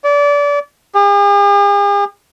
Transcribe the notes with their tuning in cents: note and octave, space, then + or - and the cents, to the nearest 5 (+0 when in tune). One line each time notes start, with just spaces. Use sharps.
D5 -30
G#4 -45